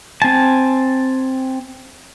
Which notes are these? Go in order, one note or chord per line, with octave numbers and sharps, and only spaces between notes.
C4 G#5 A5